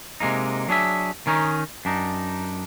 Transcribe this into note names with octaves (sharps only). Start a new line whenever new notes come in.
C3 G#3 A#3 D#4
F#3 D4 G#4 E5
D#3 C#4 D#4
F#2 D4 D#4